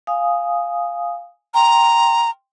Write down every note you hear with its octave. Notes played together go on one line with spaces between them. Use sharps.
F5 G#5 D#6
G5 A#5 C6